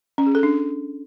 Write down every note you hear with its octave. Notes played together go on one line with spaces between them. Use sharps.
C#4
G#4
A4
D4